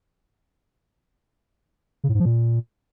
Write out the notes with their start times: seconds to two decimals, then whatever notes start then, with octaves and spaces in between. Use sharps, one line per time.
2.04 C#3
2.09 A2
2.14 G#2
2.20 F3
2.25 A#2